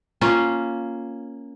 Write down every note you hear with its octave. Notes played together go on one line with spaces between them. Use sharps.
A#3 C#4 F4